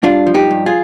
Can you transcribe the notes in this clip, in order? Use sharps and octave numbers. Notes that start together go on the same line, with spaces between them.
G2 D4 F4
F3
D#4 G4
G2
F4 G#4